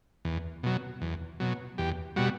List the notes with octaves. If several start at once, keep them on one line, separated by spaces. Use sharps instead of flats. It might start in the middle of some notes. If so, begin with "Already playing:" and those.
E2
B2 F#3
E2
B2 F#3
E2 G4
B2 G3 F#4